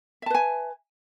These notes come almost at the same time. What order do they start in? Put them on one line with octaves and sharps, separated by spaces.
E5 A5 B4 G#5